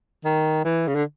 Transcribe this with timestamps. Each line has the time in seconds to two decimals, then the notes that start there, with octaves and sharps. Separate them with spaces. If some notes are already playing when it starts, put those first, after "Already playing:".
0.25 D#3
0.65 E3
0.88 C#3
0.95 D3